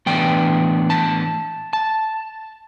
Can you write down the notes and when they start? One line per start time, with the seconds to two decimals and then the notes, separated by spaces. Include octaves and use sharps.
0.06 A2 E3 B3 D4 G5
0.90 A5
1.73 A5